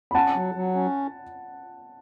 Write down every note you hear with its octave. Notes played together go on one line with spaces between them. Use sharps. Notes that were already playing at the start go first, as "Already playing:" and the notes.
B5
C#4 F#5 A5
F#3
F#3
C#4